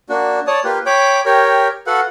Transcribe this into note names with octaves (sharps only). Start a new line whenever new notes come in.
A#3 D4 F#4
C#5 D5 A5 D#6
A#3 F4 G4 B4
C#5 G5 B5 D6
G4 A#4 C#5 G5
F#4 A4 B4 F5 F#5